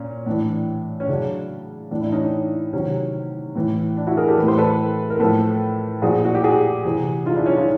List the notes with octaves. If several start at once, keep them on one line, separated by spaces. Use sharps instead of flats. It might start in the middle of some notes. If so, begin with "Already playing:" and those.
Already playing: A#2 C#4
A2 E3 D4
C#4
C#3 F#3 D4
A2 E3 D4
D4 E4
C#4 D#4
D4
C3 D#3 F#3 C#4
A2 E3
D4
E4 F#4
G#4 A#4
G4 A4
E3 B4
A2
C5
A4 B4
A#4
A2 F3 A4 B4
A#2 F3 F#4 G#4
F#4
G4
F#4 G#4
C3 E3
D#4 F4
D4 E4
C#4 D#4
D#4 F4